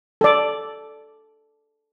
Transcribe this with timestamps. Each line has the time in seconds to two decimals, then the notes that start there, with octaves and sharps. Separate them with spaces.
0.21 A4 D5